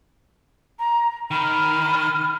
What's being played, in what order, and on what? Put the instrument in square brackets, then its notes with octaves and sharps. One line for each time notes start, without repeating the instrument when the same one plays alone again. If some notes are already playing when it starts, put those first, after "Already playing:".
[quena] A#5
[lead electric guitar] D#3 [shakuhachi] B5 [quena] F6